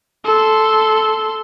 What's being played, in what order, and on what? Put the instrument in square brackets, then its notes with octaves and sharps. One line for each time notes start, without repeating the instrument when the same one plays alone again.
[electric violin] A4 C6